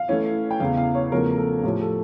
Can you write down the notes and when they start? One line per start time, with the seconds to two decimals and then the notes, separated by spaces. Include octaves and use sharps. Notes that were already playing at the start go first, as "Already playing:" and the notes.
Already playing: F5
0.08 E3 A3 C#4 E4
0.51 G5
0.60 E2 C#3 E3 F5
0.77 F5
0.95 C#5
1.12 E2 C#3 F3 A3 C#4 A#4
1.38 A4
1.63 A2 F3 C#4 G4
1.81 A4